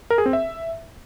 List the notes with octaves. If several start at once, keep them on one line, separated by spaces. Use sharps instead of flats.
A#4
G#4
C4
E5